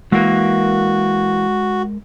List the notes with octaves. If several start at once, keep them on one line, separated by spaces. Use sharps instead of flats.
E3 G#3 A#3 F#4 A#4